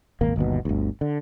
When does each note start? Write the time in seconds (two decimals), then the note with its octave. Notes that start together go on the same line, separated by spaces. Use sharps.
0.21 D#1 G#1 A#3
0.36 G1 D#2 B2
0.65 G1 D2
1.01 D3